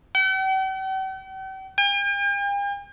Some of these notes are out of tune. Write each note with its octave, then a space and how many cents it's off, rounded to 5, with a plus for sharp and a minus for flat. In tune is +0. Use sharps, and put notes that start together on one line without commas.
G5 -45
G5 +45